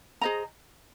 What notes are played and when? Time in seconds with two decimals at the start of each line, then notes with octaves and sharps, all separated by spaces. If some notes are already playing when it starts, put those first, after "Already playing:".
0.21 G#4 C5 D#5 A#5